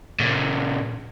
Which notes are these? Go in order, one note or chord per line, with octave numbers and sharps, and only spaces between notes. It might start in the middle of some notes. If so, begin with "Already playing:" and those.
A#2 C#3